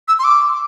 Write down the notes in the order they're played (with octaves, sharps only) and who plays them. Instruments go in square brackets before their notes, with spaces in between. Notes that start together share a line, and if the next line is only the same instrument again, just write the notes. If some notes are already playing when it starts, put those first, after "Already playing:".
[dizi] E6
C6
D6